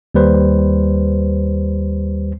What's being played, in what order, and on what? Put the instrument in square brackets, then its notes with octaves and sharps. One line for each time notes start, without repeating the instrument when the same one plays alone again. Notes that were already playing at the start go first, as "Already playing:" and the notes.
[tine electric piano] D#2 G3 B4 C5